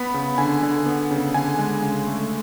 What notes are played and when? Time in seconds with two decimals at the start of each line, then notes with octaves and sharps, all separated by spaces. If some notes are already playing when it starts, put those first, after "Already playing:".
Already playing: B3 B5
0.14 C#3
0.38 D3 G#5
0.63 D3
0.86 B3
1.11 C#3
1.34 D3 G#5
1.59 G#3
1.82 C#3
2.07 A3